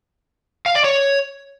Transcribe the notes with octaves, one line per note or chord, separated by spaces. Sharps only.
F5
D5
C#5